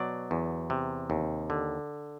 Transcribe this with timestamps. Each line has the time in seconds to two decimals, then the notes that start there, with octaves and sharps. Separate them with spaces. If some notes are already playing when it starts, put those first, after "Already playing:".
Already playing: B2 F#3 D5
0.31 E2
0.70 C3
1.10 D#2
1.50 D3